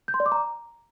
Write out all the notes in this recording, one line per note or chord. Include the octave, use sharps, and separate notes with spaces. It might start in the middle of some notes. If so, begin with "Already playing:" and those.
G6
C6
D5
D6
A#5